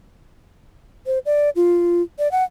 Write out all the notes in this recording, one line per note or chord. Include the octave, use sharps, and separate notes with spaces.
C5
D5
F4
D5
F#5